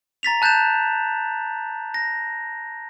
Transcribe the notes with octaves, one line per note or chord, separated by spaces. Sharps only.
A#5 A6 B6 F7
A5 F#6 G6 A6 E7
A#6